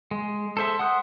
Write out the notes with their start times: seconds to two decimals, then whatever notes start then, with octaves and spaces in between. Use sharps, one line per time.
0.11 G#3
0.57 A4 C5 E5
0.79 F#5 C6 D#6 F#6